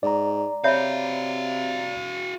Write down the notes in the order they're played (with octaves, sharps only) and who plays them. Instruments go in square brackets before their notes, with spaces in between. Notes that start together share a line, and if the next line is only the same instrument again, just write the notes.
[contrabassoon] G#2 [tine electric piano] D5 A#5
[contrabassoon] C3 [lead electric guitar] F#4 F5 [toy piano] C#5 E5 B5